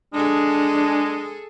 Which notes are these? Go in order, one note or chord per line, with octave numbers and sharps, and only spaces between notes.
G#3 D4 G#4 A4